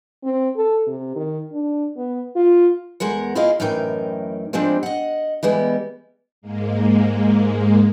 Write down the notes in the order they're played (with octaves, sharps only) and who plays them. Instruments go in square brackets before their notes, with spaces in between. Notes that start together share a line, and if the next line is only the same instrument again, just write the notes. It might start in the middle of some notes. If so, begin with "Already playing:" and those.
[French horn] C4
A4
C3
D#3
D4
B3
F4
[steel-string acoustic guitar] E2 G#3 A#4 F#5
E4 F4 G#4 C5 D#5 F5
F#2 A2 E3 D#4 A#4 G5
F3 G3 G#3 C4 D4
D#5 F#5
E3 G3 G#3 B3
[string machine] G#2 G#3 A#3